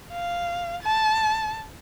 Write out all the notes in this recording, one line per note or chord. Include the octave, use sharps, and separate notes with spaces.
F5
A5